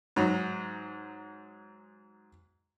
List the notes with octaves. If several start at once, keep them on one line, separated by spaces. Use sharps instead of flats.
G#2 F#3